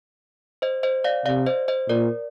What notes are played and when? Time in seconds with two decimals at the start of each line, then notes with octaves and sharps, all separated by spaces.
0.62 C5 D#5
0.83 C5 D#5
1.04 D5 F5
1.26 C3 D5 F5
1.46 C5 D#5
1.68 C5 D#5
1.89 A#2 A#4 D5